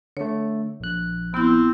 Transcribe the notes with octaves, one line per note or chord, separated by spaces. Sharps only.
D3 A3 C#5
A#1 F#6
B3 C4 E4